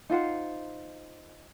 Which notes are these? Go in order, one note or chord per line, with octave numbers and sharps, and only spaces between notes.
D#4 F4 C5 F#5